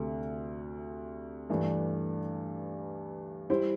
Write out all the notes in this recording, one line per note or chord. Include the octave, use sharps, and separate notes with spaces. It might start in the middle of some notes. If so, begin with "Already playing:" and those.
Already playing: D2 C3 A3
G2 E3 A3 D4
G3 E4 C5